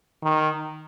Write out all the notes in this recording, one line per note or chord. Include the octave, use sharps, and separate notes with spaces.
D#3